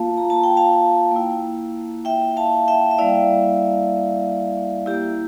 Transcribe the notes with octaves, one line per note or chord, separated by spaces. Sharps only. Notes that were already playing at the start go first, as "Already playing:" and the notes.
Already playing: A#3 F4 F5 A5
A#5
A5
G5
F5 A5
A#3 E4
E5 G5
F5 A5
E5 G5
E5
G3 A#3 E4 D5 F5
A#3 E4 G4